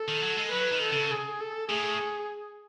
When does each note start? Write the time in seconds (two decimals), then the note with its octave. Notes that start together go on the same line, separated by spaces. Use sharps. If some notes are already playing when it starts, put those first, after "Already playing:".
Already playing: A4
0.08 D#3
0.22 F#3
0.37 G#3
0.52 F#3 B4
0.72 D#3
0.82 A4
0.92 C#3
1.11 G#4
1.40 A4
1.69 A2 G#4